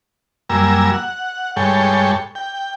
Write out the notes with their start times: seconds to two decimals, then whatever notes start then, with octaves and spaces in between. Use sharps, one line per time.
0.50 F#2 G3 A#3 G#5 A#5 E6
0.93 F#5
1.56 G2 G#3 A4 C#5 G5
2.35 G5